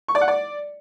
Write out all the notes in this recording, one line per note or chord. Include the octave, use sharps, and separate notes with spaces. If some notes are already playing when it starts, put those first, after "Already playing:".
C#6
D5
F#5
D5